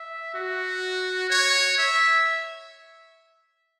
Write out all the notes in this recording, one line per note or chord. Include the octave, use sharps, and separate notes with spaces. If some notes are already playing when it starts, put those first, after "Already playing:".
Already playing: E5
F#4
C#5
E5